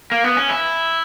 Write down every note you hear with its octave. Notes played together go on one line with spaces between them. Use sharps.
A#3
B3
C#4
E4